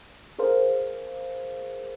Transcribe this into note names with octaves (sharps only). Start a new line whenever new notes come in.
G#4 A#4 C5 F5